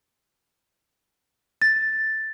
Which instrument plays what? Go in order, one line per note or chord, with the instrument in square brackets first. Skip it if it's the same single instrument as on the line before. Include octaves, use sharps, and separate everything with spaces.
[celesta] A6